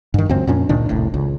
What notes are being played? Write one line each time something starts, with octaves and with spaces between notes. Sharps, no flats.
G2 D#3
C#2 F#2 C4
F2 A#2 C#4 D4
C#2 A#2 D#3 D4
F1 C2 A2
C#2